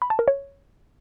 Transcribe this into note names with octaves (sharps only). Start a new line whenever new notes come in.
B5
A5
A#4
C#5